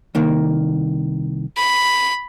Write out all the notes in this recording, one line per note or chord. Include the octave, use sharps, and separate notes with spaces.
C2 D#3 A#3
B5